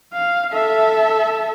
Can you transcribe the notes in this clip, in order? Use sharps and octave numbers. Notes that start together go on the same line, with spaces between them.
F5
A4 E5